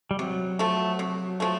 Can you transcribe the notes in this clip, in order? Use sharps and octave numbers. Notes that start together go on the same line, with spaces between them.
G3
C3 F#3
F3 A3
C3
F3 A3